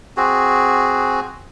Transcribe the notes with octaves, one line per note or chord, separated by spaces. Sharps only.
C4 F#4 G#4